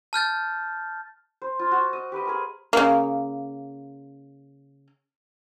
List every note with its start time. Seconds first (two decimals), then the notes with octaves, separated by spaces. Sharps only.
0.13 A5 F6 G6 A6
1.42 C5
1.59 F4
1.72 F#4
1.93 D#5
2.12 G4 B4 C5 D#5
2.26 G#4 A#4 G#5
2.73 C#3 A#3